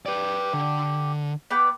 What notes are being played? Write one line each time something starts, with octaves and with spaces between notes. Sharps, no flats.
G4 B4 D5
D3
B3 D5 G5